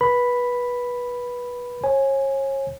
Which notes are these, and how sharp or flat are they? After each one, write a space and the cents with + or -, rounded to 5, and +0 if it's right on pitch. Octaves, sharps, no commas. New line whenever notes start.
B4 -20 B5 +0
C#5 -35 G#5 +0